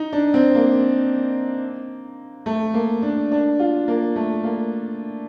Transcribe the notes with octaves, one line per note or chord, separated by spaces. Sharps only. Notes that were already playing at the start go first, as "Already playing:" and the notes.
Already playing: D#4
D4
C4
A#3
A3
A#3
D4
D4
F4
A#3
A3
A#3